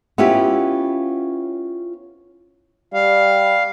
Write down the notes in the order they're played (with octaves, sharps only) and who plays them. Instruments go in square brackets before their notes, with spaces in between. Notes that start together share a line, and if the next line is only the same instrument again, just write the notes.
[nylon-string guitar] B3 C#4 E4 F4 G4
[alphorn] G3 [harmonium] F5